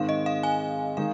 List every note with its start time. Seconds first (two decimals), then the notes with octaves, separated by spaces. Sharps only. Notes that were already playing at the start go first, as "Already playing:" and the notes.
Already playing: G#2 D#3 G#3 C4 F5
0.09 D#5
0.26 F5
0.43 G#5
0.97 D#3 G#3 D#4 G#4 F5